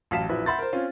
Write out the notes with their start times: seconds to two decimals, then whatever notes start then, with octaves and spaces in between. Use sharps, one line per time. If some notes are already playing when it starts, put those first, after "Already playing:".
0.11 A1 F#3 F5 A5 B6 E7
0.29 A#1 F#3 E4 B4
0.46 E5 F#5 B5 C6 G6 A6
0.59 A#4 C5
0.73 C4 C#4 F4